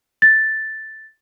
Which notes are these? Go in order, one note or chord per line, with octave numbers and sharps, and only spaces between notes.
A6